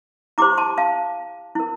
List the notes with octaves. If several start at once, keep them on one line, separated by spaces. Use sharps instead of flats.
E4 G4 C5 A#5 D6
A5 C6
F5 A5
E4 A#4